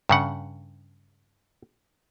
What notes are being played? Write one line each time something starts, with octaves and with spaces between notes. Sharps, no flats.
G2 C#3 F#5